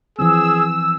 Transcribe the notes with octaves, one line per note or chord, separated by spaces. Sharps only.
E3 F3 C4 G#4 E6